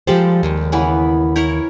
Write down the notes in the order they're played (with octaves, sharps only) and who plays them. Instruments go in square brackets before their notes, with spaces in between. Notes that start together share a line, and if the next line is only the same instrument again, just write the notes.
[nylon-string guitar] F3 G4 C5 [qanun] G3 G#3 A4
[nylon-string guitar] D#2
[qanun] C#3 E3 B3
E4 A#4 C#5